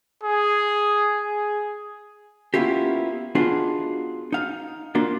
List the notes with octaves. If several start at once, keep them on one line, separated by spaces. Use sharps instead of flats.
G#4
G#4
A#3 B3 C#4 E4 F4 G4
B3 D4 D#4 F4 F#4 G#4
D#4 F5
A#3 D4 F4 F#4